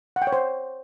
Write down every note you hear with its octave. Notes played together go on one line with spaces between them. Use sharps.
F#5
G5
C#5
C5